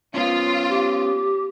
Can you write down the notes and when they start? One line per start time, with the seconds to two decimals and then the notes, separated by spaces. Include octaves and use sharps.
0.14 B3 C#4 F4
0.69 G4